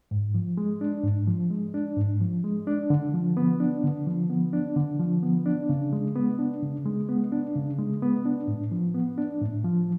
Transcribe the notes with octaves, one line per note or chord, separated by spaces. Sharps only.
G#2
F3
G#3
D4
G#2
F3
G#3
D4
G#2
F3
G#3
D4
D3
F3
B3
D4
D3
F3
B3
D4
D3
F3
B3
D4
C#3
G#3
B3
D4
C#3
G#3
B3
D4
C#3
G#3
B3
D4
A2
F3
B3
D4
A2
F3